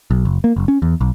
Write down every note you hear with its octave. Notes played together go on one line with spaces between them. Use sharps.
B1
F#1
A#3
F#1
C#4
E2
B1